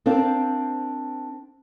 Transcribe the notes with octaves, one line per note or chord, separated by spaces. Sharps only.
C4 D4 A#4 C5 F5